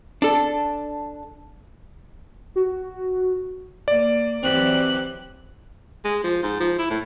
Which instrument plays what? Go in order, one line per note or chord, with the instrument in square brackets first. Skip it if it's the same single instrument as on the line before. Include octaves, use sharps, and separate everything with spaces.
[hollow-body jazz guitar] D4 A4
[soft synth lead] F#4
[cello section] A#3 [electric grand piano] D5
[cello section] E3 F#3 G4 [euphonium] C4 [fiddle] F#6
[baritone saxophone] G#3
F3
G#2
F3
E4
A2